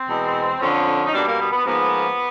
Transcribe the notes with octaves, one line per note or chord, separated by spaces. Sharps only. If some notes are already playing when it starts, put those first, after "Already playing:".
Already playing: C4
E2 B2 G#3
F2 D3 F3 C#4
D#4
B2 G3 A#3 D4
A#3
B3
B3
G#2 F3 A#3 B3